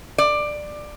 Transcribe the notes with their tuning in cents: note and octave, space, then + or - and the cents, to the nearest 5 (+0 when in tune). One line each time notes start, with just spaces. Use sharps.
D5 +15